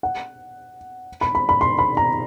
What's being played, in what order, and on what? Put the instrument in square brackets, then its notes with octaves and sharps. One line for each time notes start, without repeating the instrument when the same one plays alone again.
[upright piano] F#5
B5
B5
B5
C6
B5
A#5